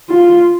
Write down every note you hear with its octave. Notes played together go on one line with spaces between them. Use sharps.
F4